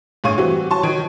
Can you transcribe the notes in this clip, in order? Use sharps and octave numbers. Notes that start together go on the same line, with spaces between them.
G1 A2 G#4 F5 C#6 D#7
E3 G3 C4 F#4
F#3 A5 C6 C#6
D#3 F3 F#3 G#6 D7